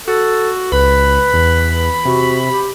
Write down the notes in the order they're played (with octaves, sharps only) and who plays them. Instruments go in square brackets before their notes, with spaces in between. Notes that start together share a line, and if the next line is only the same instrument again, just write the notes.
[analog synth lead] F#4 [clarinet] A4
[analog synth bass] C#2 [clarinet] B4 [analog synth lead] B5
[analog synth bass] E2
[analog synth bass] C3 [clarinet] F#4
[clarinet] G4